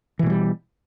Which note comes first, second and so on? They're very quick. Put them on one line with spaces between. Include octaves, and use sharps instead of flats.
E3 B2 G#3 G3